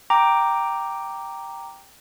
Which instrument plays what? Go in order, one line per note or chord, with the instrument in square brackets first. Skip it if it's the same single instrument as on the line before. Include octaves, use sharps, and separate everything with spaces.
[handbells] G5 A#5 D6